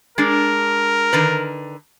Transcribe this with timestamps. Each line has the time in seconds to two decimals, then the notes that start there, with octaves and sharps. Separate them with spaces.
0.18 G#3 D4 A#4
1.13 D3 D#3 B4